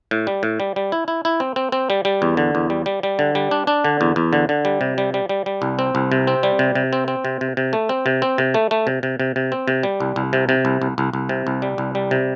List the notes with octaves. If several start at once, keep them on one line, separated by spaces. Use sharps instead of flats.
A2
G3
A2
G3
G3
E4
E4
E4
C4
C4
C4
G3
G3
E2
D3
E2
G3
G3
G3
D3
G3
D4
D4
D3
E2
E2
D3
D3
G3
C3
G3
G3
G3
G3
C2
C4
C2
C3
C4
G3
C3
C3
C4
C4
C3
C3
C3
A3
C4
C3
C4
C3
A3
A3
C3
C3
C3
C3
C4
C3
G3
C2
C2
C3
C3
C2
C2
C2
C2
C3
C2
G3
C2
G3
C3